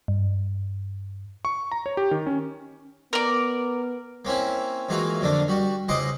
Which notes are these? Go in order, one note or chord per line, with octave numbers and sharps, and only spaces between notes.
G2
C#6
A#5
C#5
G4
D#3
C#4
B3 A#4 D5
A#3 C4 C#4 E4
G#2 E3 A#3 F4 F#4
F2 D3 A#3 D4
G3 F#4
C#2 G#2 D#5 F#5 C6 D6